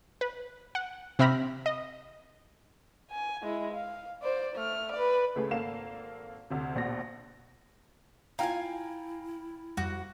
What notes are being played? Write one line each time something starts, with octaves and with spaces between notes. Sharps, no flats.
B4
F#5
C3 C4 E5 B5 F6 A#6
D#5
G#5
G#3 E4
F5
C5 D5
A3 F6
B4 D5
C#2 A3 G#4 B4
G#1 A#3 A4 F5 E7
D2 C3
A#1 B2 A#6
E4 F4 F5 G5 G#5 A#5
F2 G3 F#4